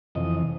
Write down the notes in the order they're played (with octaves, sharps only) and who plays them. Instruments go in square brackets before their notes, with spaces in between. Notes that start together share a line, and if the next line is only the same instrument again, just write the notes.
[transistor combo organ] F2 C3 E3 D#5